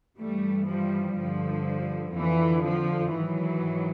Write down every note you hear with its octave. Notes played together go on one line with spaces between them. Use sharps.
G2 E3 G3 A3
F3 G3
G2 D3 F3
F2 D3 E3
F3
G#2 D#3 E3 F#3